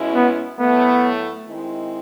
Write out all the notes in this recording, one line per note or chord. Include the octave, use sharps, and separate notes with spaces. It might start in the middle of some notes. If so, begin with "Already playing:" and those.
Already playing: B2 G#3 C#4 E4
B3
A2 F#3 A3 B3
D#3 G#3 C4 E4